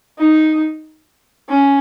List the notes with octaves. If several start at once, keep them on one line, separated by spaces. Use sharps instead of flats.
D#4
C#4